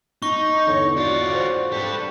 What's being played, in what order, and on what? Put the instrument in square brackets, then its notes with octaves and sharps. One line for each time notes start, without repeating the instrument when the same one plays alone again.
[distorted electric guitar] D#4 [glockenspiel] C#6
[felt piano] E2 D3 [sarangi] C#5
[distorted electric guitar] F4 F#4 [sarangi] D5
[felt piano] C5
[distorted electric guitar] G4 B4 [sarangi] A4